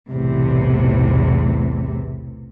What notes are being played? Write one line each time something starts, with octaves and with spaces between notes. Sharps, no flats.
B1 E2 A2 C3